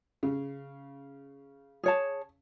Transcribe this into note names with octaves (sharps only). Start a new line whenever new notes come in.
C#3
G#4 C#5 A5